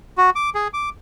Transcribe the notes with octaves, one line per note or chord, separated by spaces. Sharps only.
F#4
D6
G#4
D6